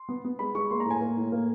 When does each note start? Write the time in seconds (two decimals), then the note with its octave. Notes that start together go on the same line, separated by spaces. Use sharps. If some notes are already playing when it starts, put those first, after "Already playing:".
Already playing: C6
0.09 B3
0.25 B3
0.39 G#3 B5
0.55 G#3 C#6
0.71 A#3 C6
0.80 A#5
0.86 A2 G#5
1.01 A#3
1.17 A2
1.32 A#3